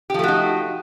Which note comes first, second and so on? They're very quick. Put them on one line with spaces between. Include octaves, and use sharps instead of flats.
G4 F3 A3 F#4 D#4